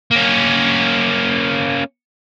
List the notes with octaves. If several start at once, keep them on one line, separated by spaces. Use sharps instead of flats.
A#3 C#4